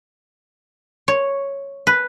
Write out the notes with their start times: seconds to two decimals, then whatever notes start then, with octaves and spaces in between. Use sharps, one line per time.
1.08 C#5
1.87 B4